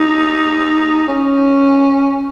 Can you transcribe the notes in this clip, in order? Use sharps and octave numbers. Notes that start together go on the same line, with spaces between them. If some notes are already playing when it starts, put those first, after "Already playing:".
Already playing: D#4
C#4